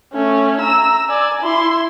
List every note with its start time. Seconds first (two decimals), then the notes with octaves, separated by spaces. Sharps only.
0.13 A3 C#4
0.60 A#5 E6
1.09 D5 G#5
1.42 E4 C6